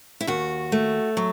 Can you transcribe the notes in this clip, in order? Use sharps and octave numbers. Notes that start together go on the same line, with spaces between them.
E4
D#2 F#4
A3
F#3